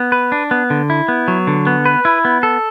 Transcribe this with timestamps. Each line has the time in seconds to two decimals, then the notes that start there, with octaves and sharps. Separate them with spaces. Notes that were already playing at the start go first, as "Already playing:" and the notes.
Already playing: B3
0.12 B4
0.32 D4
0.51 B3
0.70 D3
0.90 E4
1.08 B3
1.28 F#3
1.47 D3
1.67 B3
1.86 B4
2.05 E4
2.25 B3
2.43 A4